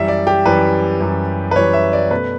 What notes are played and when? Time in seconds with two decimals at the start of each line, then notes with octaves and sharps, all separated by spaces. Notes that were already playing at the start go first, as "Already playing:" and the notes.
Already playing: F#2 E3 G3 E5
0.08 D5
0.27 G4
0.45 F#2 E3 G3 B4
1.01 F#2 E3 G3
1.51 B4
1.56 F#2 E3 G3 C#5
1.73 E5
1.93 D5
2.10 B2 A3 B4